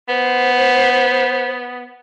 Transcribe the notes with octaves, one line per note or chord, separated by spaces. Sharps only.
B3 C5